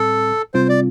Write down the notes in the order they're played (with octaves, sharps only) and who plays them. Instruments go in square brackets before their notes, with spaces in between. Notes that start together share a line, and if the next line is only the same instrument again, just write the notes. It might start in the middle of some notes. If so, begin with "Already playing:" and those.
Already playing: [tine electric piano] A2 G3 C4 [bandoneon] A4
[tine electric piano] C3 G3 C4 F4 [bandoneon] C5
[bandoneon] D5